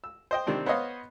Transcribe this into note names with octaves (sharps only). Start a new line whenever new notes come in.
E6
C5 D#5 G5
C3 D#3 G3 C4 D4
B3 C5 C#5 D#5 F5